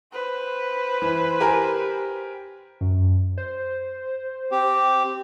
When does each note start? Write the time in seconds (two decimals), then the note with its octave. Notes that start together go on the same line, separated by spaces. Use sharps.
0.13 B4 C5
1.02 E3
1.40 G4 A#4 G#5
2.81 F#2
3.38 C5
4.51 C4 G4